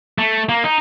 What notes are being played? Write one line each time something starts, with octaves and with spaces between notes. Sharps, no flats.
A3
A#3
D#4